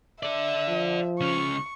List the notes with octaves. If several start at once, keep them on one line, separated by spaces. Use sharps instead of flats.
A4 D5 E5
F3
C#2 C#4 C#6